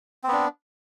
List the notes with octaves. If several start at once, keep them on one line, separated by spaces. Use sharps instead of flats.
B3 C4 D4